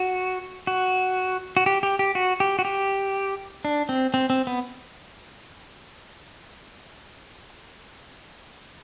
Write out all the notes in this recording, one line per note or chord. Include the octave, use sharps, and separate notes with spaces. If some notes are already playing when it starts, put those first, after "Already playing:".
Already playing: F#4
F#4
F#4
G4
G4
G4
F#4
G4
F#4
G4
D4
C4
C4
C4
B3